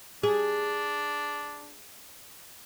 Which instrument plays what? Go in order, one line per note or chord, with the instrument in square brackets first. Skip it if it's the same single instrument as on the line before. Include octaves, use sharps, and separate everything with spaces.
[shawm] D4 [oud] G#4